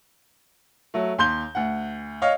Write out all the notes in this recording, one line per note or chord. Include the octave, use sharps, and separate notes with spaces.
F#3 A3
D#2 C6 G6 G7
D2 F#5
C#5 D#5 F5